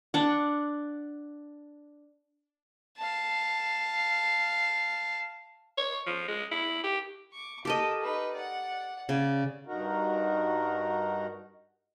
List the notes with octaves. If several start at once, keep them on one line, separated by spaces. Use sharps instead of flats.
D4 F#5
F5 A5
C#5
F3
G#3
E4
G4
C#6 D6
G4 A4 A#4 D#5 A5
D#4 B4
D5 F#5
C#3 D5
G2 D#4 F#4 A#4